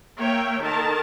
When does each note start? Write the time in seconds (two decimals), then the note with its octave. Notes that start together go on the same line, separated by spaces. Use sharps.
0.17 A#3 C#5 E5 G5
0.61 D#3 A4 A#4 A5